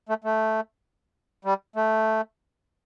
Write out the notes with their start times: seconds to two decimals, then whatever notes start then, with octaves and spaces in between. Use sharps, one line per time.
0.09 A3
0.24 A3
1.45 G3
1.76 A3